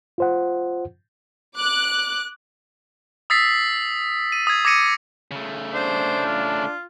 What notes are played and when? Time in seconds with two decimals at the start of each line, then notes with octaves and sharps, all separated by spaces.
0.18 F4 C5 F#5
1.56 D6 F#6
3.30 D#6 E6 A6 B6 C7
4.32 D#7
4.47 D#6 G#6
4.65 D6 G#6 A#6 C#7 D#7
5.31 C#3 A3
5.74 D4 C5
6.26 F4